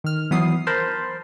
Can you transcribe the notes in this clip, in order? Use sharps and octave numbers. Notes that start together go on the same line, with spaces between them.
D#3 F6
E3 F#3 B3 D#6 C7
A#4 C5 A5 B5 C6